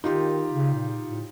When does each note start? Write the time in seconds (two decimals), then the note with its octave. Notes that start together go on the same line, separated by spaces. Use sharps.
0.04 D#3 D#4 F4 G4
0.53 C#3
0.75 A#2
1.08 A2